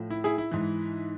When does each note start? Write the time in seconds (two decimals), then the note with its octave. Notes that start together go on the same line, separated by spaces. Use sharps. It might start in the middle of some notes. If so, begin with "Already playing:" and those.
Already playing: A2 F3
0.10 E4
0.24 E4 G#4
0.38 E4
0.51 G#2 E3